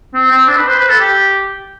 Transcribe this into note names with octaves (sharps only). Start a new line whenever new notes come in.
C4
C4
D4
B4
C5
B4
A4
G4